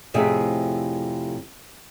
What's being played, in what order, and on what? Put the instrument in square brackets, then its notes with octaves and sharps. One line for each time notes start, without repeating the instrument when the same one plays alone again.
[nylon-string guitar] F2 A2 C3 G#4 E5